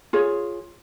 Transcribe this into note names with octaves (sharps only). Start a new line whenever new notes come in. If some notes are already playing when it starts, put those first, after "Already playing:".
F4 G#4 C#5